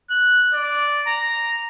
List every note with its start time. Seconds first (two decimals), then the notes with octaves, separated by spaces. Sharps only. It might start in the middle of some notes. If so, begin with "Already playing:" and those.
0.10 F#6
0.54 D5
1.07 A#5